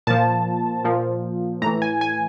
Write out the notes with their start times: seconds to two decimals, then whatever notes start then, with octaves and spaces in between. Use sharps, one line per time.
0.07 A#2 F3 A5
0.85 A#2 F3
1.62 A2 A#5
1.66 E3
1.82 G#5
2.01 G#5